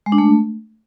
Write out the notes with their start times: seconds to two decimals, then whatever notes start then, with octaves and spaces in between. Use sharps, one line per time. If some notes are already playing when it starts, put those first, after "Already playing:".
0.06 G#3
0.12 D4
0.18 A3